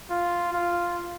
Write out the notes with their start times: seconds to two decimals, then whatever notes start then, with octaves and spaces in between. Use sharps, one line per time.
0.10 F4
0.54 F4